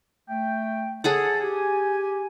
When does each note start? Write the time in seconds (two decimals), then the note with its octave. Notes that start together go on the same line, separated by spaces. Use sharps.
0.29 A3 E5 G5
1.04 G#4 A4 C#5 F#5 A5
1.41 G4 G#5